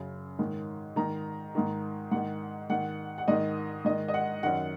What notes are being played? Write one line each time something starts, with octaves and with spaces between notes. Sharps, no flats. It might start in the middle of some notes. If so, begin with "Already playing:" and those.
Already playing: F#2 C#3
G#2 D#3
G#2 D#3 A#5
G#2 D#3
G#2 D#3 F#5
G#2 D#3 F#5
F#5
G#2 D#3 D#5
G#2 D#3 D#5
D#5
F#5
F#2 D#3 F#5